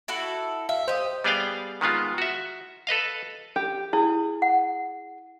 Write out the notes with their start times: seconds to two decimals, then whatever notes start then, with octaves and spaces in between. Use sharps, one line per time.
0.08 E4 F#4 A4
0.69 E5 F5
0.88 G4 C5 D#5
1.24 G3 B3 G#4 D5 F5 G5
1.81 D#3 G#3 B3 F4
2.18 F#4 E5
2.87 A4 B4 D#5 F5
3.56 G4
3.93 E4 G#4
4.42 F#5